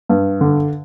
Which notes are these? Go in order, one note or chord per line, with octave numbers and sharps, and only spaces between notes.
G2
D3